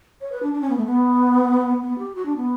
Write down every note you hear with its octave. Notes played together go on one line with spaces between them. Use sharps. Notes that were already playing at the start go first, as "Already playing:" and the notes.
C#5
B4
D4
D4
C#4
B3
A3
B3
B3
G4
F#4
D4
B3